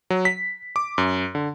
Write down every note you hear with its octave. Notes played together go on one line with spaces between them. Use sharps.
F#3
B6
D6
F#2
D3